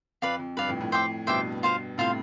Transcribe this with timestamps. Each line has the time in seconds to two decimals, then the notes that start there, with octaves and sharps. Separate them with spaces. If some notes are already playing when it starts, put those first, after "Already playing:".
0.22 F2 B4 D5 F5
0.39 F2
0.57 G2 B4 D5 F5
0.69 F2 A2
0.81 F2 A2
0.92 C5 E5 G5 D6
1.27 G2 B2 C5 E5 G5 D6
1.63 F4 C5 F5
1.98 A2 C3 F4 C5 F5